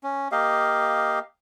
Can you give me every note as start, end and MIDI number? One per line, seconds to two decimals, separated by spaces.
0.03 0.28 61
0.32 1.19 58
0.32 1.19 67
0.32 1.19 75
0.32 1.19 77